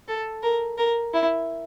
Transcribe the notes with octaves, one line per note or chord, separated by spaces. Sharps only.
A4
A#4
A#4
E4